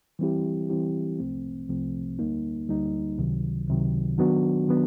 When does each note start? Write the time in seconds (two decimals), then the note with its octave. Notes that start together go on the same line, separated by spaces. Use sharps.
0.19 E3 G3 C4 E4 G4
0.69 E3 G3 C4 E4 G4
1.19 C2 C3 F3 A3 C4
1.69 C2 C3 F3 A3 C4
2.19 D2 D3 G3 A#3 D#4
2.68 D2 D3 G3 A#3 D#4
3.18 C#2 C3 D#3 F#3
3.68 C#2 C3 D#3 F#3
4.18 D#3 F#3 B3 D4 F#4
4.68 D#3 F#3 B3 D4